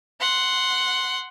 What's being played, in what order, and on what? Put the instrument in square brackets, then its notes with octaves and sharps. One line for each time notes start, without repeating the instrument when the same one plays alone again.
[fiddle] F#5 C6